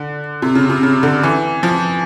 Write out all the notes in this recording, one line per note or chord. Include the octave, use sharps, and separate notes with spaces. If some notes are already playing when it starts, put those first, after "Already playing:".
Already playing: D3
C3
C#3
C3
C#3
D3
E3
F3